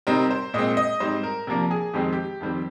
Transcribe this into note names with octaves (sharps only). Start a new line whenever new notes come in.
C3 G3 C4 D#4 A#4
C5
A#2 G#3 C4 D#5
D#5
G#2 G3 C4 D#4 C5
A#4
C3 F3 A#3 D4 A#4
G#4
F2 D#3 G#3 C4 D#4 G4
G4
F2 D#3 G3 C4